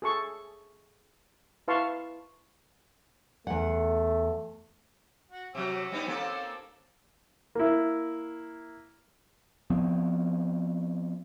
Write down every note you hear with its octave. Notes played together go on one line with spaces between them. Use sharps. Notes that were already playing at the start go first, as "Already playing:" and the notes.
G#4 A4 C#6
E4 B4 F5 A5 C6 C#6
E2 A3 F#5
F#4
C3 F#3 C#4 E6
G3 B3 D#4
A#3 C4 A4
A#3 E4
F3 B3 C4